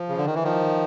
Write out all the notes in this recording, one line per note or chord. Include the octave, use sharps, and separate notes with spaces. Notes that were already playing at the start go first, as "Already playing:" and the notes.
Already playing: F3
C#3
D3
D#3
E3
D#3 F3